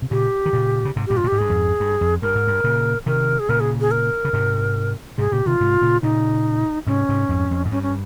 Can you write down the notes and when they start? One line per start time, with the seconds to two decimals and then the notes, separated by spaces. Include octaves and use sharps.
0.02 C3
0.11 A#2 C#3 G4
0.46 D#3
0.53 A#2 C#3
0.85 C#3
0.96 G#2 C3
1.07 G2 A#2 G4
1.17 F4
1.24 A#2
1.27 G4
1.32 G#2
1.38 G2 G#4
1.49 F2 G#2
1.80 G2
2.01 F2
2.22 G2 A#4
2.35 G#2
2.48 G2
2.64 A#2 C#3
3.06 C3 D#3 A#4
3.39 G#4
3.49 A#2 C#3 A#4
3.60 G#4
3.81 G#4
3.91 A#4
4.25 C#3
4.33 G#2 C3
5.18 G#2 C3 G#4
5.32 A#2 C#3 G4
5.46 C3 D#3 F4
5.60 G#2 C3
5.81 A#2 C#3
6.03 A#2 C#3 D#4
6.87 G#2 C3 C#4
7.09 G#2 C3
7.29 F2 G#2
7.51 F2
7.65 G#2
7.71 G2 C#4
7.83 C#4